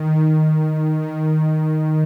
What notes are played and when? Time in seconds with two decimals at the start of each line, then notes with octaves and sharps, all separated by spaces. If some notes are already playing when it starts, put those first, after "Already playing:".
Already playing: D#3
0.13 D#3
1.02 D#3